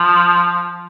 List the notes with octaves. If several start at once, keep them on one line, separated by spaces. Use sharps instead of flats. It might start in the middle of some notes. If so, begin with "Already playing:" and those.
Already playing: F3